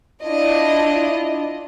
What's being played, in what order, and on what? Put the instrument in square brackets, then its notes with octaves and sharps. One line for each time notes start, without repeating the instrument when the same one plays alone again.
[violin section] D4 E4 F4 D#5